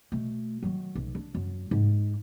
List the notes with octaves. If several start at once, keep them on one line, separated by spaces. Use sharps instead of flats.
B2 A3
D#3 F#3
B1
D4
F#2
G#2